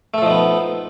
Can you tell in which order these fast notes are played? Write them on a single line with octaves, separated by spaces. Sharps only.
A3 A4 F3 D#4 B3